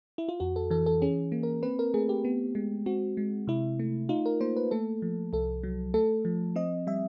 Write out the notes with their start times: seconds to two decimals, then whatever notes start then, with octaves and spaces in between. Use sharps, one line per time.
0.18 E4
0.29 F4
0.40 F2 F#4
0.56 A4
0.71 E3 A4
0.86 A4
1.02 C#4 G#4
1.32 A#3
1.43 A#4
1.63 C4 B4
1.79 A#4
1.94 A3 G#4
2.09 G4
2.25 B3
2.55 G#3
2.86 C4 F#4
3.17 G#3
3.47 C3 E4
3.79 A3
4.09 D#4 F4
4.26 A#4
4.41 A#3 C5
4.56 B4
4.71 A3 A4
5.02 F3
5.33 C2 A4
5.63 F#3
5.94 A3 A4
6.25 F3
6.56 C4 D#5
6.87 G3 E5